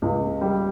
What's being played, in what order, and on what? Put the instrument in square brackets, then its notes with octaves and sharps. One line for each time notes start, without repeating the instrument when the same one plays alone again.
[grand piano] C#2
G3